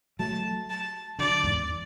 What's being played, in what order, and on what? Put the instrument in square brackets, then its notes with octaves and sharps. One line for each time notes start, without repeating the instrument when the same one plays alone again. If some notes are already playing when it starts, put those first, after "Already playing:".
[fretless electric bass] F#3 A3 [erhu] A5
[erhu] A5
[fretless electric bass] D3 F#3 [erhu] D5
[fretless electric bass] E2 G#2